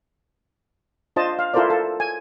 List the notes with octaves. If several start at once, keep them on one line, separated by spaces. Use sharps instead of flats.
D4 F4 C5 D#5 A5
F5
E4 F4 A4 A#4 C5 D5
A4
G#5